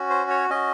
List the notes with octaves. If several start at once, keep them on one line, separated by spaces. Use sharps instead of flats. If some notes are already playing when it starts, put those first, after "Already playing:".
Already playing: C#4 F#4
C5
C#5
C#4 F#4 D#5